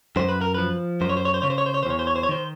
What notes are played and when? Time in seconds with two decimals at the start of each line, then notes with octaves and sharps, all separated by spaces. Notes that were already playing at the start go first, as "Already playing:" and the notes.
0.16 F#2 C5
0.29 B4
0.41 A#4
0.54 F3 B4
1.01 F#2 C5
1.09 C#5
1.17 C5
1.25 C#5
1.34 C5
1.42 C#3 C#5
1.50 C5
1.58 C#5
1.66 C5
1.74 C#5
1.83 C5
1.86 E2 C#5
1.99 C5
2.07 C#5
2.16 C5
2.23 C#5
2.29 D#3 C5